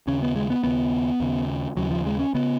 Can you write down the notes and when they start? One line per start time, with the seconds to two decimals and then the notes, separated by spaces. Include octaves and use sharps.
0.07 D#2 C#3 C#4
0.22 B3
0.36 G#3
0.50 B3
0.64 D#2 C#3 B3
1.20 D#2 C#3
1.77 D#2 C#3 F#3
1.91 F3
2.06 G#3
2.19 C#4
2.34 C#3 B3